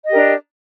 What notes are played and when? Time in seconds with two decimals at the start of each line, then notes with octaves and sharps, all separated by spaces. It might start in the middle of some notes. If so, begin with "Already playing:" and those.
0.05 D#5
0.08 G4
0.12 A#4
0.15 D4